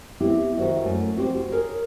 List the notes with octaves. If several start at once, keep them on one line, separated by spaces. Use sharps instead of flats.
B3 C4 E4 G4
D#3 F#4 G4 C5 E5
F#2 A3
C4 F#4 G4 C5
G#4 A#4 C#5